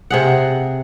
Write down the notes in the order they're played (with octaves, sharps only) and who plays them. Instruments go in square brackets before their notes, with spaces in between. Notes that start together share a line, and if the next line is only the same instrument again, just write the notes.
[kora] C3 G#4 F#5